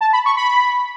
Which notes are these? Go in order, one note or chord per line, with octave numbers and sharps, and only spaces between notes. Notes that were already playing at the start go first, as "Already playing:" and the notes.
A5
B5
C#6
B5